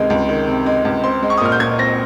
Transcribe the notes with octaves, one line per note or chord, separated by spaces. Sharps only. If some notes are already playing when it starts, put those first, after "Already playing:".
Already playing: C#2 C3 D#3 G#3
C#2
D#3
C3
G#3
C#2
C4 C6
G#3
C#6
D#6
A#2 F6
G6
A#2 G#6
C4 A#6